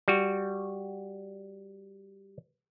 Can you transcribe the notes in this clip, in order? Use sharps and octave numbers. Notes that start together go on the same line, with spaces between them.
G3 F#4